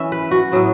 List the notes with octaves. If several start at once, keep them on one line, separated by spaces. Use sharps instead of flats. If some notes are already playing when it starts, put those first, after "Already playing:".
Already playing: E3 C#4 E4 E5
B4
F#4
A2 F#3 B3